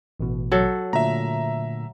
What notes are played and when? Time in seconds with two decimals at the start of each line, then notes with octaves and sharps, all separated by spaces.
0.20 A1 B2
0.52 F#3 A4
0.93 A#2 D3 A3 E5 A#5